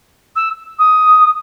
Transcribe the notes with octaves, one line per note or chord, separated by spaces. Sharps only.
E6
D#6